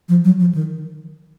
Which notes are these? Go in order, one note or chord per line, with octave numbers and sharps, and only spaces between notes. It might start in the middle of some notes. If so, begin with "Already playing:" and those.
F3
F#3
F3
D#3